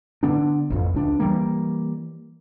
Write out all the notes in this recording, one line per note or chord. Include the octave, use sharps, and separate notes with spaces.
D3 B3 D4
A1 F2
C#2 D4
E3 G3 A#3